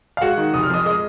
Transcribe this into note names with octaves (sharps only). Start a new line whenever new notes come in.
F5
G#3 F#4 F#5
D#3
F1 D#6
F6
F2 D#5 D#6
G#3 D#5 D#6